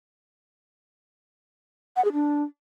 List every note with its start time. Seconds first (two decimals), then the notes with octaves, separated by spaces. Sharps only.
1.96 F#5
2.05 G#4
2.13 D4